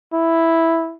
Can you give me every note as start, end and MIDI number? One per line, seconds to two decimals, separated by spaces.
0.13 0.95 64